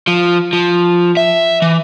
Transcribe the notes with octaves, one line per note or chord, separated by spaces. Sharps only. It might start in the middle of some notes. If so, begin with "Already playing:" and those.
F3
F3
E5
E3